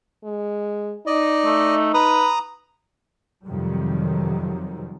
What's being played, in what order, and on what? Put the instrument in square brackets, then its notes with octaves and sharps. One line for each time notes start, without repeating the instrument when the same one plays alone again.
[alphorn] G#3
[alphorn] D#4 [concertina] D5 D#5
[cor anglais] A3
[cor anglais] B4 [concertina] A#5 D#6
[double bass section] F2 C3 D#3 F#3 G3